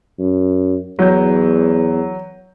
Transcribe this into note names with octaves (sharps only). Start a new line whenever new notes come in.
F#2
E2 F#3 G6